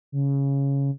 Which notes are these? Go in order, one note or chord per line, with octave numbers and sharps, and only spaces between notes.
C#3